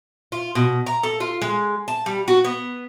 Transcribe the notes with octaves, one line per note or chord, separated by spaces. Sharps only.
F4
B2
A#5
A4
F4
G#3
A5
G3
F#4
B3